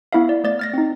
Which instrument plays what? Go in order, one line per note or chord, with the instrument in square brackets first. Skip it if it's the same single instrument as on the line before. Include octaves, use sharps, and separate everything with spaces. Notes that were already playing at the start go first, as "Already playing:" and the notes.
[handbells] B3 E4 E5 F5
D5
A3 D5 A6
F6 A6 A#6
C4 D#4